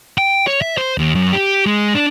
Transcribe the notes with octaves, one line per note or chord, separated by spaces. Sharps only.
G5
C#5
E5
C5
D#2
F#2
G4
G#3
D4